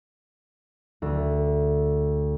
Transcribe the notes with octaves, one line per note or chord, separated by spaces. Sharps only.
D2